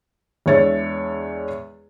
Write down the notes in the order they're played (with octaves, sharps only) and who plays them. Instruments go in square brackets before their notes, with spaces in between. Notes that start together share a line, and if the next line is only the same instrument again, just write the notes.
[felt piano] E2 G#3 D4 C#5 E5 A6